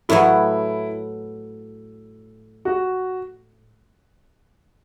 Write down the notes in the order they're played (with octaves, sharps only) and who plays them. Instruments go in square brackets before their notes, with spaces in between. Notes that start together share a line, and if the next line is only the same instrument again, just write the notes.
[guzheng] A2 F#3 B3 [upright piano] E4
[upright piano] F#4